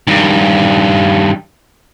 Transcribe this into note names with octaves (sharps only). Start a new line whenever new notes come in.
G2 D#3